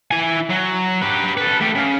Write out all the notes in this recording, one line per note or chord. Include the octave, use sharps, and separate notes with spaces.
E4 G#5
F#3
G4 B4
A4 B4
A3 G4
C#3